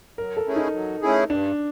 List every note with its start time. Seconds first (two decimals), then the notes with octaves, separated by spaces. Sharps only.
0.18 F#3 A#4
0.37 A4
0.47 A3 C#4 E4 G#4
0.56 D#4
0.74 F#3
1.02 A3 C#4 E4 G#4
1.30 G2 D4